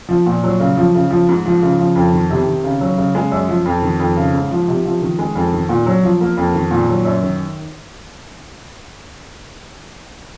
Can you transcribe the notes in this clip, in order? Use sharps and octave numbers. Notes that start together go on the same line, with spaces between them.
F3
A#2
F#3
C#3
F3
C#3
F3
G#2
F3
C#3
F3
F2
D#3
C3
D#3
C#3
F#3
C#3
G#3
F#2
F3
F2
D#3
F2
C#3
G#2
F3
C3
F3
D#3
G#3
F2
D#3
A#2
F#3
F3
A#3
F2
D#3
A#2
F#3
F#2
D#3